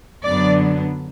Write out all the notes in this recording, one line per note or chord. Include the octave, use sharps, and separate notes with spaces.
F#2 D3 F#3 B3 D4 D5